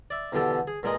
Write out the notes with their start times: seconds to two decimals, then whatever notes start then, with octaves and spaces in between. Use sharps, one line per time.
0.10 D5 E5
0.32 E2 B2 D3 G3 G4 A4
0.67 G#4
0.83 G2 A#2 G#3 A#4 D#5 D#6